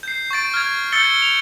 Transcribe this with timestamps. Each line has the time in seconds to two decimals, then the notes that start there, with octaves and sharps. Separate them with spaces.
0.03 G6 C7
0.31 C#6 G6 A6 D7
0.54 F6 G#6
0.92 E6 F6 G6 A6 C#7 G7
1.22 F7